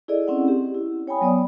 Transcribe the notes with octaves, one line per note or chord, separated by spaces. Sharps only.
E4 G#4 A4 D5 D#5
C4 C#4 E4 F#5
C4 G4
E4
C#5 G5 G#5 B5 D#6
F#3 B3 C#5 D5 D#6